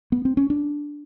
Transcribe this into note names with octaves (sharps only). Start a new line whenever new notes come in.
B3
C4
C#4
D4